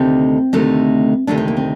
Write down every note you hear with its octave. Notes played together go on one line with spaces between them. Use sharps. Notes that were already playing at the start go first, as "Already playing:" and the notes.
Already playing: D2 C3 D#3 A3 C4
D2 C3 D#3 A3
D2 C3 D#3 A3 D4
C4
A#3
C4